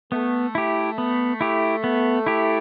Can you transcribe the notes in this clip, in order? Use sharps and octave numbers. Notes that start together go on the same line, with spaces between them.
A3 B3
E4 G4
B3
E4 G4
B3
E4 G4